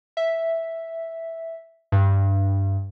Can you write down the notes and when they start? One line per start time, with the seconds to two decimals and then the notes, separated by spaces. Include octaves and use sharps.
0.17 E5
1.92 G2